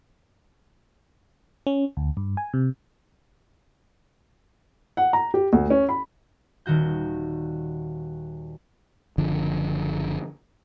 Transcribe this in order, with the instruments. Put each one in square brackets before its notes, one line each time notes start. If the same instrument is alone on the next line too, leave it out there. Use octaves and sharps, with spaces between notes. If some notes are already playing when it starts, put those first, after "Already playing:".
[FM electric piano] C#4
D2
G2
G#5
C3
[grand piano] F#5
A#5
G4
D2
C#4
B5
[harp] D#1 D#3 F#4 G6
[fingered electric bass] F#1 D3 F3